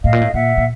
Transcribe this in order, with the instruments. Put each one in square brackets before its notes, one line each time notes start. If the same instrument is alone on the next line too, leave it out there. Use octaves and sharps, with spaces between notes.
[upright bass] A2 [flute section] D#5 F5
[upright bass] A#2
A2
[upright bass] A#2 [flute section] E5 F#5
[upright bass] A#2